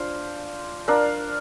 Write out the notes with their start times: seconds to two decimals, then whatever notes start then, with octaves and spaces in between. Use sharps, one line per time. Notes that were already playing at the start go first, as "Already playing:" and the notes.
Already playing: D4 F4 C5 F5
0.88 D4 A#4 F5